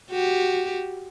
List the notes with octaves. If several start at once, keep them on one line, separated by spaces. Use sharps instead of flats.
F#4 G4